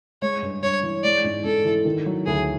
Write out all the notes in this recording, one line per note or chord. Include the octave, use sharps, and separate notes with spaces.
G#3 C#5
G2
G2 C#5
E3
G#3 D5
G#2
G#2 A4
E3
D#3
F#3
D2 G#4